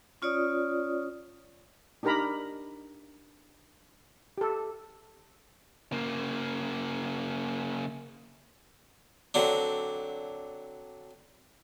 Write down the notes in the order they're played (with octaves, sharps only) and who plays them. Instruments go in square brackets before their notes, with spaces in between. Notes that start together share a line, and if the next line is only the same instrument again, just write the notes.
[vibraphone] C#4 F4 C#5 D5 D#6
[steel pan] D4 D#4 G4 A#4 A#5 B5
G4 A4
[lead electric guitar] C#3 A#3
[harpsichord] D3 F#3 C4 D4